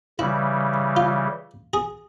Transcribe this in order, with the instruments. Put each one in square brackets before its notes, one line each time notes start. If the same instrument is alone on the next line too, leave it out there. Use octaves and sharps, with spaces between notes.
[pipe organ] C#3 E3 G3 [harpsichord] E4
[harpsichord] F4
G#4